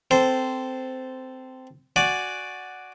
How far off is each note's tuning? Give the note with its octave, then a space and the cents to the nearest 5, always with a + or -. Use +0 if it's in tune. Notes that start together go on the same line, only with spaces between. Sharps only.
C4 -15 A4 +0 C5 -10
F#4 +0 D5 +0 G#5 +0